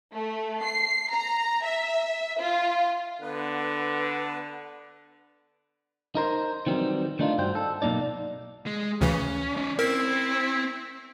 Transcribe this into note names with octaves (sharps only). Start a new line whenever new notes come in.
A3
C7
A#5
E5
F4
D3 B3 B4
D#4 A#4 C5
D#3 E3 F#3 G3 C4
D#3 A3 D4 D#4 F4
G2 F#4 C5 G5
A4
B1 C#3 A#3 D#4 D5
G#3
D2 C#3 E3 C#4
C#4 D#4
C4 E4 A#4